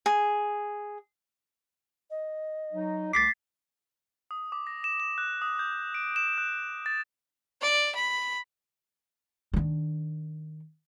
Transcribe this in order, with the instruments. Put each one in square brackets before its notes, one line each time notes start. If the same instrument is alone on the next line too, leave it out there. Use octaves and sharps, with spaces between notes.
[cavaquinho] G#4
[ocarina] D#5
[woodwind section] F#3 D#4
[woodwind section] C2 A3 D6 [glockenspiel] A6 B6 C7
[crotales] D#6
D6
A#6
E7
E7
F#6
D#6
G6
D7
E7
F#6
A6
[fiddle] D5
B5
[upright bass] D#3 D4